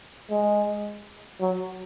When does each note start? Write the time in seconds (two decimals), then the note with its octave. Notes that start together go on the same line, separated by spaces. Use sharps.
0.30 G#3
1.41 F#3